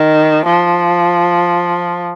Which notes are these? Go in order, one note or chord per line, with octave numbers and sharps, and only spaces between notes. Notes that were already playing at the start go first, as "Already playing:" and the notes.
Already playing: D#3
F3